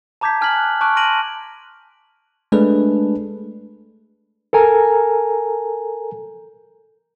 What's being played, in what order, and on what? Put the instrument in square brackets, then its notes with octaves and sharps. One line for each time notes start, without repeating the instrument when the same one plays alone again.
[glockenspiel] A5 A#5 D6 G6 G#6 B6
G#5 F6 G#6 B6 F#7
F#6
A5 C#6 D6 F#6 D7
C6 F6 A#6 D7 D#7 F#7
[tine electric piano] G#3 A3 D4 G#4 A4 B4
[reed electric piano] A4 A#4 G#5 A#5